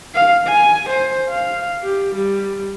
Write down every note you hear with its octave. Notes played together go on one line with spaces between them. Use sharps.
F5
G#5
C5
F5
G4
G3